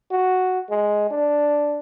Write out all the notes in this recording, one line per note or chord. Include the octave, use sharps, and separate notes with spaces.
F#4
G#3
D4